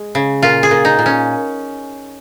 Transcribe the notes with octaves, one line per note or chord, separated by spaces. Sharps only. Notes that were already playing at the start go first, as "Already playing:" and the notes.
Already playing: G#3
C#3
A#2 F4
G#4
A#2
D#4
A#2
C#4